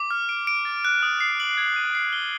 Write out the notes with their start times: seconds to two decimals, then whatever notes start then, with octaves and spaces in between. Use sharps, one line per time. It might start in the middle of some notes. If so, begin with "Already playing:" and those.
Already playing: D6
0.11 F6
0.29 D7
0.47 D7
0.65 A6
0.85 F#6
1.03 D#6
1.20 C7
1.40 F#7
1.58 G#6
1.76 D#7
1.95 C7
2.13 G7